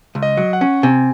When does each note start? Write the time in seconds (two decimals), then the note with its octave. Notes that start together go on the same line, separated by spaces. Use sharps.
0.15 C#2
0.23 D#5
0.37 F#3
0.53 F#5
0.61 C#4
0.83 C3 G#5